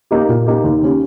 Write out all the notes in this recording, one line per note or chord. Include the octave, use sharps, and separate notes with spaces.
A#3 D#4 G4
A#2
A#3 D#4 G4
D#2
D#3 A#3 C#4 G4